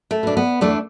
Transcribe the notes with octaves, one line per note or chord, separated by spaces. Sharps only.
A3
B2 D4
B3
E2 A3 D4